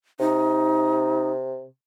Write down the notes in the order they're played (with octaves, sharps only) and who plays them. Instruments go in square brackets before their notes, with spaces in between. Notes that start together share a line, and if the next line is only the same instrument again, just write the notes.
[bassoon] C3 [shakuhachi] D#4